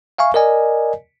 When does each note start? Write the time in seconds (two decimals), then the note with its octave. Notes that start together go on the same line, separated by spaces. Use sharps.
0.18 E5 F5 G#5 C#6
0.34 A#4 D5 D#5 G#5